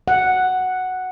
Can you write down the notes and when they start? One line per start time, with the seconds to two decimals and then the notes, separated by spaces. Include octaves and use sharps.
0.08 F#5